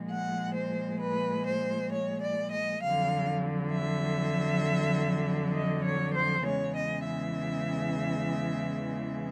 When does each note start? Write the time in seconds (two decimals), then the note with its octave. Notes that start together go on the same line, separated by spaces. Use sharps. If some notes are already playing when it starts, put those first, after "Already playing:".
Already playing: A#2 F3 G#3
0.09 F#5
0.54 C5
1.00 B4
1.46 C5
1.92 C#5
2.22 D5
2.52 D#5
2.81 F2 D3 F#3 F5
3.72 E5
5.54 D#5
5.85 C#5
6.15 C5
6.45 E2 C#3 E3 G#3 C#5
6.76 D#5
7.05 E5